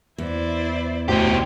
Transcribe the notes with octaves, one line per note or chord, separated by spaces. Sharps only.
E2 E4 C5 D5
A1 D2 B2 F#4 G4 C5 C#5 C6